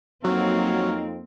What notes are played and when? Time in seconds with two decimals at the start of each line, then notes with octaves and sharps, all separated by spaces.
0.24 F2 F#3 A#3 C4 D#4 C#5 F5 A#5